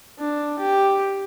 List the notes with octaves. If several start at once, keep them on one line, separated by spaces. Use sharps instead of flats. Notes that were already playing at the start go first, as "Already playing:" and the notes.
D4
G4